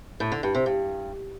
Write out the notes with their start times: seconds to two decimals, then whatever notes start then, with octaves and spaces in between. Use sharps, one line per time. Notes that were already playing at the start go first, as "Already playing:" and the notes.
0.20 A2
0.32 D3
0.43 G2
0.55 C3
0.66 G2